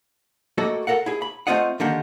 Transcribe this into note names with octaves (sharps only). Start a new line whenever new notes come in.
A3 A#3 F#4 A4 D#5
A4 A#4 F5 F#5
E4 G#4
B5
A3 B3 C4 F4 D#5 F#5
D3 D#3 A#3 G4 F#5